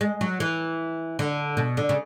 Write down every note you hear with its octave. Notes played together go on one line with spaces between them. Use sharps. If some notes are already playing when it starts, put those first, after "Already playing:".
G#3
F#3
E3
D3
B2
D3
C#3